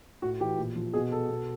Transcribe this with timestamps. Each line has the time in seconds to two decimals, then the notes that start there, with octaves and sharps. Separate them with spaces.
0.22 A2 F#4
0.40 E3 G4
0.58 A#2
0.76 F3
0.93 B2 G#4
1.12 A4
1.30 B2